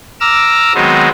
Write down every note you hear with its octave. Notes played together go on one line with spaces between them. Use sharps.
A#5 D6 E6 F6
D#3 F#3 G#3 B3 C4 D#4